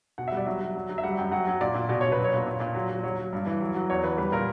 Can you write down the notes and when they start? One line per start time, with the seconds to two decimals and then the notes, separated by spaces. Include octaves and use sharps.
0.18 B2 F#5
0.28 G3 E5
0.37 D5
0.46 F#3 E5
0.61 F#3
0.76 F#3
0.89 F#3
0.98 E5
1.03 G3 F#5
1.18 F#2 G5
1.32 F#3 F#5
1.47 F#3
1.61 A#2 D5
1.74 A#2
1.89 B2 D5
2.01 B2 C#5
2.12 B4
2.18 F#3
2.24 C#5
2.33 A#2
2.46 A#2
2.60 A#2
2.75 F#3
2.89 F#3
3.03 F#3 C#5
3.18 F#3
3.33 G2
3.46 E3
3.61 F#3
3.75 F#3
3.89 E2 C#5
4.04 E3 B4
4.17 G3 B4
4.32 A#2 A#4